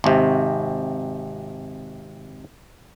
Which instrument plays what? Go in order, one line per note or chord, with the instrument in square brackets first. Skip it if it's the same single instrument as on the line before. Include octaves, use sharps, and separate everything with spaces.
[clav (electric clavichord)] G#1 C3